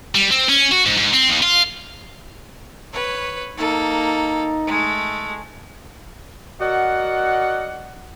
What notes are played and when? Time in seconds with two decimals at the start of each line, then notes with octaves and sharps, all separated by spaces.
0.15 G3
0.31 C4
0.49 C#4
0.71 F#4
0.86 G#2
0.97 G#2
1.13 C4
1.29 D#2
1.42 F4
2.93 B4 C#5
3.57 A#3 D#4 A4
4.67 G#3 A3
6.60 F#4 A#4 D5 D#5 F#5